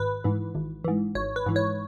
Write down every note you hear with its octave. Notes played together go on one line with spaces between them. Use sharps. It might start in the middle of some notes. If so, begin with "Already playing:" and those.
Already playing: G#1 B4
G#2 E3
G#1
G#2 E3
G#1 C#5
B4
G#2 E3
C#5